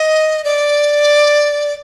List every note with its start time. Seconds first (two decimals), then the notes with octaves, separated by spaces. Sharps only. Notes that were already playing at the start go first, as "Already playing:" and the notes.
Already playing: D#5
0.44 D5